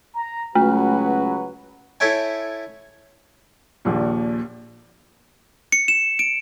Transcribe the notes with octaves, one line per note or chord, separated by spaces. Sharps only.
A#5
C#2 F#3 A3 F#4 B4
E4 A4 C#5 E5 G5 G#5
A#1 D#2 A#2
C#7
E7
D7